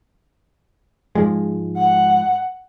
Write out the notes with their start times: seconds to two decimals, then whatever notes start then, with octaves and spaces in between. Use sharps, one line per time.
1.15 G#2 F3 G#3
1.77 F#5